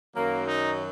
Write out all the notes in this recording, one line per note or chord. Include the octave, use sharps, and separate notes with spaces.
F#2 D#3 F#3 A#3
D#4